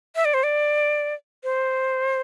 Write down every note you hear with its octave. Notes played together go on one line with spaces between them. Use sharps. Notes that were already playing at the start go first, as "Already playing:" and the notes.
E5
D5
C5
D5
C5